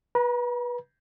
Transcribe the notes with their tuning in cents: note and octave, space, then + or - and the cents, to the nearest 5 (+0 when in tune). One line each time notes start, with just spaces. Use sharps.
B4 -20 A#5 +40